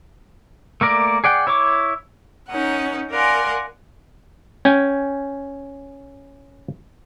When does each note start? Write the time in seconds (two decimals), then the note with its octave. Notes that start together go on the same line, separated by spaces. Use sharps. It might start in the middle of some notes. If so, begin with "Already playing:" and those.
0.81 A3 A#3 A#4 D5
1.24 G#4 D5 F#5 G5
1.47 E4 C#5 C#6 D6
2.49 C#4 D#4 A#4 F#5
3.10 A#4 D5 F5 F#5 G#5 C6
4.65 C#4 G5 G#5